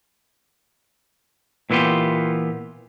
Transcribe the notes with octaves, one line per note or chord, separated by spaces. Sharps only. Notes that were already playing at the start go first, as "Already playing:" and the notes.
A#2 E3 B3 F4 G4